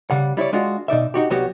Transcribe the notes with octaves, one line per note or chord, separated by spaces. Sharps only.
C#3 G3 F#5
G3 E4 C#5 D5
G#3 D4 F4 F#4
B2 D#4 D5 E5
D#4 F#4 G4
C2 F#3 B3 F#4 G4